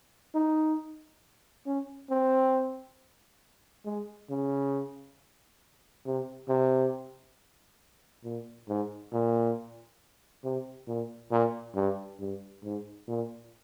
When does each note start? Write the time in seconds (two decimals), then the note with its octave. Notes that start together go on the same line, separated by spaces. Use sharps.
0.35 D#4
1.66 C#4
2.10 C4
3.85 G#3
4.30 C#3
6.06 C3
6.48 C3
8.24 A#2
8.68 G#2
9.13 A#2
10.44 C3
10.88 A#2
11.31 A#2
11.75 G2
12.20 G2
12.64 G#2
13.08 A#2